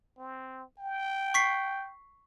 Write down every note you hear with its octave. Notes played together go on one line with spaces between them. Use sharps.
C4
G5
C#6 B6 C7